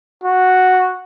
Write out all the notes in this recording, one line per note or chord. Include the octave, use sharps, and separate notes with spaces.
F#4